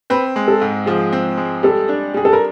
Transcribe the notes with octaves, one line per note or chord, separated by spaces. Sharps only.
C4 B4
G#3
A4
G#2
F3 G#4
C4
G#3
G3 A4
D4
G3 G#4
A4
A#4